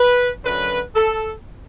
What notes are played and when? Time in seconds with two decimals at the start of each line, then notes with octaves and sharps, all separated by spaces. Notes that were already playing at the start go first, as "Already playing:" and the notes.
Already playing: B4
0.44 F#2 D3 F#3 B4
0.95 A4